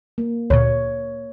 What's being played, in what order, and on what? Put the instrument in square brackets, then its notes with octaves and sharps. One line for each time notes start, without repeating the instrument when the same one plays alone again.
[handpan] A#3
[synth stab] D2 A#2 [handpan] C#5